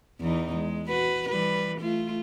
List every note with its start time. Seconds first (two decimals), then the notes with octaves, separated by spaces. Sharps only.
0.20 E2 E3 D#4
0.55 G#3
0.89 F#4 B4
1.29 E3 G3 B4
1.79 A3 F4